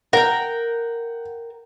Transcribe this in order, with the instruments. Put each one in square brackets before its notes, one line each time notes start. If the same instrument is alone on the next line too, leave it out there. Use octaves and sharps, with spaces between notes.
[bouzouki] A#4 G5 [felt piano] F#5